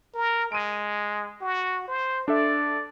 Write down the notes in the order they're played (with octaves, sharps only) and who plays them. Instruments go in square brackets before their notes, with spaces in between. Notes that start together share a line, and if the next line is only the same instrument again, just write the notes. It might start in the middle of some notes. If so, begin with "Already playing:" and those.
[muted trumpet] A#4
[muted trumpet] G#3 [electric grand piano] D7 D#7
[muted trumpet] F#4
C5
[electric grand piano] D4 A4 E5 [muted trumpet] D5